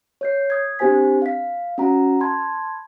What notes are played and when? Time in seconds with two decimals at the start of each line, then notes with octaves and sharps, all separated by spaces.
0.21 C#5 G6 C7
0.50 D#6 G#6
0.79 C4 D4 G4 C5 G#5 B6
1.22 F5 B6
1.78 C#4 F#4 F#5 A#5
2.20 A5 B5 C6 G#6